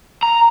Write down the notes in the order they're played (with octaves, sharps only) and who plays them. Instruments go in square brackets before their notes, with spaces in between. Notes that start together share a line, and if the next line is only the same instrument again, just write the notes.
[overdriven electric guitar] A#5